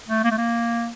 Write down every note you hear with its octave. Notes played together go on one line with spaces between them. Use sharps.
A3
A#3
A3
A#3